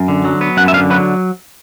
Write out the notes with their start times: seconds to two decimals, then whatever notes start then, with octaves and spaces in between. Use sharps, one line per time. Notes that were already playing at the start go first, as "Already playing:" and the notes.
Already playing: F#2
0.08 D3
0.24 F#3
0.41 B3
0.57 F#2 F#5
0.68 E5
0.73 D3 F5
0.90 F#3 B4